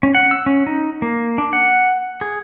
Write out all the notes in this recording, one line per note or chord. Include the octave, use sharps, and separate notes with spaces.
C#4
F#5
E6
C#4
D#4
A#3
D4
F#5
G#4